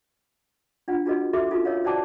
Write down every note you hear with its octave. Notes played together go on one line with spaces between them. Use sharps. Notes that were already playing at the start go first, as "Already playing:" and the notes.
D4 F4 F#5
D4 F4 F#4 G#4 B4 D#5
F#4 G#4 A4 E5 C6 D6
C#4 D#4 F4 A4
A#4 C#5 D#5 F5
F#4 C5 D5 G5 A5 D6